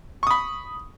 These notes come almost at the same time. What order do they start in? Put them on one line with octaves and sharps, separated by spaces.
C#6 D#6 B5